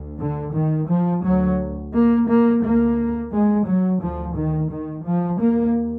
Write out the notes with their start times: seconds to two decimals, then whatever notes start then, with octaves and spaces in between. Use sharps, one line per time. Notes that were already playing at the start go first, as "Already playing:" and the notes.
Already playing: D2
0.19 D3
0.55 D#3
0.89 F3
1.24 D2 F#3
1.94 A#3
2.28 A#3
2.62 D2 A#3
3.32 G#3
3.67 F#3
4.01 D2 F3
4.36 D#3
4.71 D#3
5.05 F3
5.40 D#2 A#3